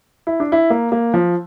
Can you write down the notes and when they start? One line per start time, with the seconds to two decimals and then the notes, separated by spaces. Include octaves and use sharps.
0.27 E4
0.40 D4
0.52 E4
0.70 A#3
0.92 A#3
1.14 F3